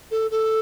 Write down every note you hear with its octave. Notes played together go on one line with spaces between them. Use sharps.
A4
A4